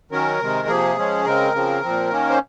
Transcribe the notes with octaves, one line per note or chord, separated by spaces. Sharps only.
D#3 F#3 C#4 A#4
C3 D#3 G#3
C3 F3 A#3 G#4
F3 G#3 C#4
C#3 G#3 C4 A#4
C#3 F3 C4
A#2 F3 C4
D#3 A#3 C#4
C5